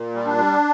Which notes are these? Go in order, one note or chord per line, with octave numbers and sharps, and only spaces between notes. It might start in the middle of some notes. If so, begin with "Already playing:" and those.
Already playing: A#2
G3
D4
G3